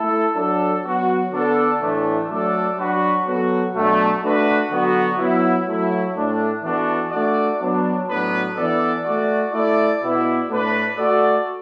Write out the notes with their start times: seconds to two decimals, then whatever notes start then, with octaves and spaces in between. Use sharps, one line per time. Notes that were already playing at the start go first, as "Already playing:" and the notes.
Already playing: A3 E4 A4
0.35 F#3 D4 A4
0.83 F#3 B3 F#4
1.31 D3 B3 D4 A4 D5
1.80 A2 E3 A3 D4
2.29 F#3 A3 D4 A4 D5
2.76 F#3 D4 F#4 B4
3.25 F#3 B3 F#4 A4
3.72 B2 F#3 A3 D4
4.22 A3 D4 F#4 B4
4.70 D3 F#3 B3 F#4
5.17 F#3 B3 E4
5.66 F#3 A3 E4
6.14 A2 A3 D4
6.62 E3 B3 D4 F#4 A4
7.11 A3 D4 F#4 D5
7.59 F#3 B3 D4
8.07 A2 F#3 B3 D4 B4
8.55 E3 B3 D4 A4 D5
9.03 A3 F#4 D5
9.52 A3 E4 A4 D5
10.00 B2 B3 E4 D5
10.49 A2 A3 D4 B4
10.96 A3 F#4 A4 D5